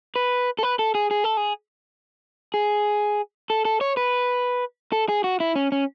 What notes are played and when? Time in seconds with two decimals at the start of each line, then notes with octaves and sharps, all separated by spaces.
0.16 B4
0.59 A4
0.63 B4
0.79 A4
0.95 G#4
1.11 G#4
1.24 A4
1.37 G#4
2.54 G#4
3.50 A4
3.65 A4
3.81 C#5
3.97 B4
4.92 A4
5.09 G#4
5.24 F#4
5.40 E4
5.55 C#4
5.72 C#4